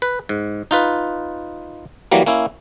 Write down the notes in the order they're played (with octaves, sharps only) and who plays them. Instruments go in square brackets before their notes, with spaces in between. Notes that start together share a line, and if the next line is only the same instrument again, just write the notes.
[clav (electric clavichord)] B4
G#2
D#4 F4 B4
E3 F#3 G3 A#3
A#3 C#4 E4